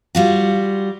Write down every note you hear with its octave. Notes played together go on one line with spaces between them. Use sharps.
G3 F4 F#4